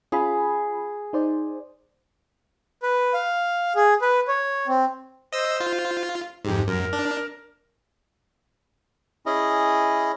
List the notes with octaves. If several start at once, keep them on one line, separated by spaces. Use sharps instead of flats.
C#4 F4 G#4 B5
D#4 C5 D5
B4
F5
G#4
B4
C#5
C4
C5 D#5 E6
F4
F2 G#2 G4
F#2 A#4
D4
C#4 E4 G#4 D#5